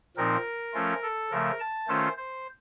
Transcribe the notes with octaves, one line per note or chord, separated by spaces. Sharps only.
A#2 F3 C4 D#4 A#4
F3 A3 C#4 F4
A4
C#3 F3 A3 A#4
A5
D#3 A3 C#4 F4 C5
C5